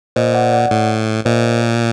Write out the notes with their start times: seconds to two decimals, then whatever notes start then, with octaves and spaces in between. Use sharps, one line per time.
0.16 A#2 C5 D#5
0.34 D5 F#5
0.53 D5 F#5
0.71 A2
1.25 A#2 C5 D#5
1.61 A#4